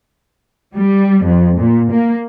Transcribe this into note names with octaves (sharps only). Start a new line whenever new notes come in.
G3
F2
A#2
A#3